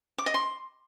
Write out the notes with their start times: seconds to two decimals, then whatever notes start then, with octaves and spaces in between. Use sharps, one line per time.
0.18 D6
0.26 D#5
0.34 C6